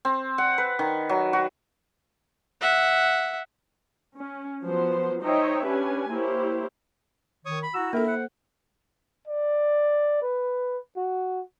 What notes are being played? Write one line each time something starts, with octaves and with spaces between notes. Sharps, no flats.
C4
F#5
B4
D#3
F#3
F#4
E5 F#5
C#4
F3 F#3 B3 C5
D#4 C5 C#5 D#5 E5 G5
C#4 D4 G4 B4 G#5
A#3 E4 G4 C5 C#5
D#3 C#5 C#6 D#6
B5
E4 F#4 A#5 E6
A#3 D4 E4 F4 A4 A#4
C5 F#5
D5
B4
F#4